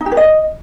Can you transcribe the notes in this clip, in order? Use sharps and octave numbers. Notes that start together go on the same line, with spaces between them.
D#4
G4
B4
D#5